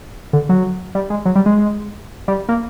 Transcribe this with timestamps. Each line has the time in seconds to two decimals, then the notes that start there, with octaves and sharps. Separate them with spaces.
0.33 D3
0.49 F#3
0.95 G3
1.10 G#3
1.25 F#3
1.35 G3
1.46 G#3
2.28 G3
2.49 A#3